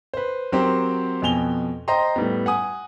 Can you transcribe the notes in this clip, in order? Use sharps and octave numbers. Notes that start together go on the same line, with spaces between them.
B4 C5
F#3 C4 G4 A#4 C5
F2 B2 G#5 F7 G7
C5 D#5 G5 A#5 C6
A2 G3 B3
F#5 G#5 D#6